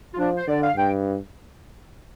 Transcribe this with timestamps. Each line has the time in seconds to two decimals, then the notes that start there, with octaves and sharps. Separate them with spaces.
0.14 F4
0.18 F3 D4
0.37 C5
0.47 D3 D5
0.62 F5
0.76 G2 G5